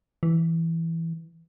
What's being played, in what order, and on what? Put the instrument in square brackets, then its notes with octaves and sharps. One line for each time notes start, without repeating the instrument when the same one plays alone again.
[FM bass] E3